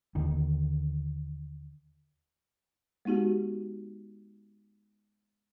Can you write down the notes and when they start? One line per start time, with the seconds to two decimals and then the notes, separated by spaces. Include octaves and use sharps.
0.15 D#2 D3 D#3
3.05 G#3 B3 D#4 F#4 G4